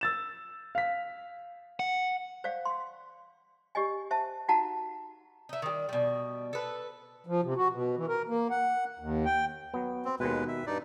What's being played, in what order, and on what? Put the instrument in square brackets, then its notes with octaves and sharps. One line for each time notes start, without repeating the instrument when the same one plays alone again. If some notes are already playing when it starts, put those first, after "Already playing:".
[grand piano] E6 A6 E7
F5 B6
[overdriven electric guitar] F#5
[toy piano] C5 D5 F5
C6
G4 D5 D#5 G#5
C5 E5 A5
D#4 F#4 F#5 A5 A#5
[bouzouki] D#4 E4
D#3 G3
B2 G3
A4 B4
[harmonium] F3
C3
F#4
B2
E3
A#4
A#3
F#5
D#2
G5
[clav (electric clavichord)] F#3 B3
[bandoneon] C4
[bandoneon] D#2 G#3 B4 [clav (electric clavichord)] B2 D#3
[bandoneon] E5
G2 D#4 D5